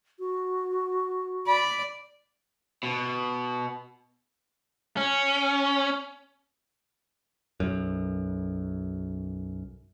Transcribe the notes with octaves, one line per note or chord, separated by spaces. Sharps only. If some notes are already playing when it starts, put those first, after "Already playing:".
F#4
D5 B5
B2
C#4
B1 F#2